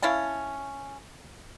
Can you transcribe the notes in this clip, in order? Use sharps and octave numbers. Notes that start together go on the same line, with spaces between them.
C#4 E4 F5 A5